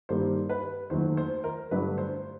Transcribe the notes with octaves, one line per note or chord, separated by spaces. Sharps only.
G2 D#3 G3 A#3 C5
B4
D#2 D#3 F#3 A3 C5
C5
A#4
G2 D3 F#3 A3 B4
C5